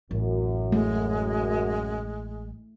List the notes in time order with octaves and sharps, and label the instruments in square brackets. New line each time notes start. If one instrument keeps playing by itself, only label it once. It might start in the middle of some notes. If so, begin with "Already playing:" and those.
[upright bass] A1 [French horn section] F#2
[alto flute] G#3 [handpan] A3